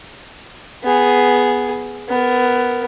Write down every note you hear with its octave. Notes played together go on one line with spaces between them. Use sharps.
B3 G#4
B3 A#4